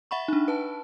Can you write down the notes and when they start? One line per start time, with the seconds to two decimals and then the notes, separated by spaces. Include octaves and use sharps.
0.11 E5 F#5 B5 C#6
0.28 D4 D#4
0.48 B4 A5